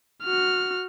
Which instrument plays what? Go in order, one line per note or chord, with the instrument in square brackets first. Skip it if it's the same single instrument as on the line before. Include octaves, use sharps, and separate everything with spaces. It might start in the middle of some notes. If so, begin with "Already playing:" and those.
[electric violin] F#4 F6